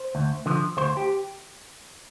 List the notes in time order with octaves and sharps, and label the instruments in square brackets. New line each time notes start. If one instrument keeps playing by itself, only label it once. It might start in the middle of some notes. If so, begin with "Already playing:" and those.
Already playing: [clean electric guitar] C5
D2
D3 F3
D2 C5
G4